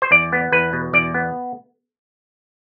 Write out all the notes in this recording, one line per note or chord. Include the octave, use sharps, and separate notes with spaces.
C5
E2 D5
B3
E2 B4
B2
E2 D5
B3